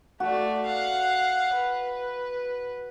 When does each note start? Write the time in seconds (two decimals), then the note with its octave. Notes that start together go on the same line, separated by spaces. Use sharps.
0.20 A3 F#4 D5
0.66 F5 F#5
1.54 B4